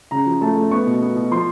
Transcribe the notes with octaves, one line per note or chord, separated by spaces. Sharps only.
C#3 A#5
F3
A3 A5
A3
B3 C#6
B2
B3
B2
F3 C6